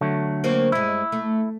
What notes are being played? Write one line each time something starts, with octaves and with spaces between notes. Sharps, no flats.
D3 F#3 A3
A#3 C4 F#4
G2 G#3 E4
A3